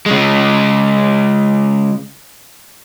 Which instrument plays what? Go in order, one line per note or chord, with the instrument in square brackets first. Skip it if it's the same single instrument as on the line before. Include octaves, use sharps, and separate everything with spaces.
[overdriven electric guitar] C#3 G#3